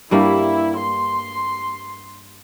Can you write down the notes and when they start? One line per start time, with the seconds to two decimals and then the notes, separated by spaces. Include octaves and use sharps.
0.11 G2 G3 A#3 E4
0.80 C6